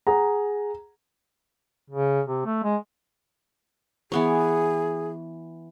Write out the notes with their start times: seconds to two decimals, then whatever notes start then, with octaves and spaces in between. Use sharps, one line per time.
0.07 G#4 F#5 A#5
1.90 C#3
2.27 C3
2.46 A3
2.63 G#3
4.12 E3 B3 G#4 C#5